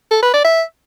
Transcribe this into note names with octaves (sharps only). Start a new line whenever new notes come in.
A4
B4
D5
E5